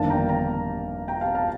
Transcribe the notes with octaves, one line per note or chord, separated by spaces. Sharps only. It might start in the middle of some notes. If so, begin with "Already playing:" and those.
Already playing: G1 F2 D#3 A#3 D4 F5 A5
G5 A#5
G5 A#5
G5 A#5
F5 A5
F5 A5